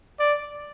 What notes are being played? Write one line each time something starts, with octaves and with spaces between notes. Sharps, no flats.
D5